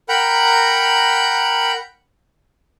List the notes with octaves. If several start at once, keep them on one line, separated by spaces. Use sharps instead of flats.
A#4 F#5 G5 A#5 B5